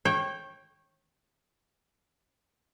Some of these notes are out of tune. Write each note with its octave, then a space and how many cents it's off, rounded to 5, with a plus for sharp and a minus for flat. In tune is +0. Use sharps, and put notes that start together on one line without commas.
C#5 -25 G5 +0